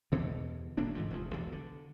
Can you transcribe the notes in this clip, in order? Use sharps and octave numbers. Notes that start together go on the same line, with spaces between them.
E2 G2 B2 D3
F#1 A2 A#3 D4
G#2 D3 E3 F3
F1 E2 F3
B1 E2 D3
D3